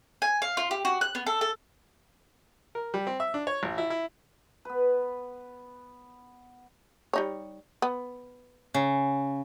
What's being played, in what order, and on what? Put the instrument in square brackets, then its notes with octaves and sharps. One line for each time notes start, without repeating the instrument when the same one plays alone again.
[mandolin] G#5
F5
F4
G4
F#4
F#6
B3
A4
A4
[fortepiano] A#4
G3
C4
E5
D4
C#5
A1
E4
E4
[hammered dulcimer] B3 B4
[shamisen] G3 D#4 C#5
B3
[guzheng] C#3